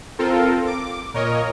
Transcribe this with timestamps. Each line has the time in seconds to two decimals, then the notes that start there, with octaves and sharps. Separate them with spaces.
0.19 C4 F4 A4 A#4
0.67 D6
1.14 A#2 A#4 C#5 D#5